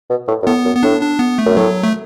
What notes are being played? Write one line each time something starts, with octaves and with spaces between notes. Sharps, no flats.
B2
A2
F#2
A2 B3
F#2
B3
A2 D4
D4
B3
A3
F#2
A2 F#3
A3